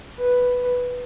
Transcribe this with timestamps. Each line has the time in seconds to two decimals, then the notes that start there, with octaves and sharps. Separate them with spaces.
0.18 B4